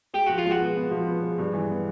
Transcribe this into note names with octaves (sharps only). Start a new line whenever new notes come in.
G#3 G4
F3 F#4
F4
G#3
F#4
B3
B3
F3
B3
G#3
G2
E3
B3